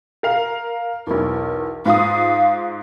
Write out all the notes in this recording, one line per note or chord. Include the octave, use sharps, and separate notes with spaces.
A#4 F5
B1 E2 A#4
G#2 F4 F5 D#6